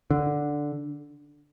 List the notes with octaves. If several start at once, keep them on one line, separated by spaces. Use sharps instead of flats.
D3